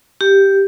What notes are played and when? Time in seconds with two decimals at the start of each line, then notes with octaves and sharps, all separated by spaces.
0.21 G4